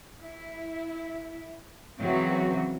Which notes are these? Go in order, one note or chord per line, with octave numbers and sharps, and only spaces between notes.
E4
C#3 E3 F#3 C4 F#4